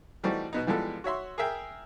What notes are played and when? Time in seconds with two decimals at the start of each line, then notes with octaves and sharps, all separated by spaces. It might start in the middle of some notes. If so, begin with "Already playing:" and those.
0.24 E3 G3 A3 C4 D#4 F#4
0.53 B2 B3 D#4
0.67 E3 F3 G3 G#3 B3 A4
1.04 F#4 C#5 E5 C6
1.38 G#4 A#4 E5 G5